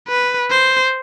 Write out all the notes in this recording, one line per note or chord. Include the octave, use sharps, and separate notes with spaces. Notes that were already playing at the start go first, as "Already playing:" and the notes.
B4
C5